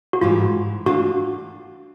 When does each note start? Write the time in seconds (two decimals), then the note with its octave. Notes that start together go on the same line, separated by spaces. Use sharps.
0.13 F#4
0.21 G#2 E3 G3 F4
0.86 E3 A3 D4 F4 F#4